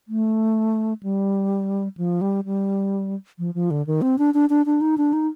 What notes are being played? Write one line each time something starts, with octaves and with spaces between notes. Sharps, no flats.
A3
G3
F3
G3
G3
F3
F3
D3
D#3
C4
D4
D4
D4
D4
D#4
D4
D#4